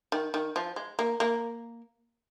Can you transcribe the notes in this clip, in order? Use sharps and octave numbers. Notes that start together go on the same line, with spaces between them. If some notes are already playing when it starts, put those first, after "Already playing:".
D#3
D#3
F3
G#3
A#3
A#3